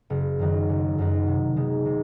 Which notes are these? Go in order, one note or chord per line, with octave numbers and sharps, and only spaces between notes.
F#1
F#2 D#3 F#3
F#1
F#2 D#3 F#3
C3
D#3 G#3 B3
C3